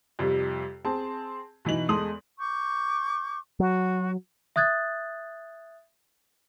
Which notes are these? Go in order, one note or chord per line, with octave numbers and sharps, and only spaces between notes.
F2 C3 G3
C4 G#4 A5
B2 E3 D#4 F#7
E2 G#3 A4 C6 D#6 F#7
C#6 D6 G6
F#3 F#4
E5 D#6 F#6 G#6 A6